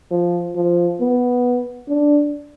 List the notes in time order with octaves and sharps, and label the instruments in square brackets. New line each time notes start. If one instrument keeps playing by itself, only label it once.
[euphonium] F3
F3
B3
D4